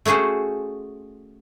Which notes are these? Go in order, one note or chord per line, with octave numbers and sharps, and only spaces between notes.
A3 C#4 F#4 G#4 C5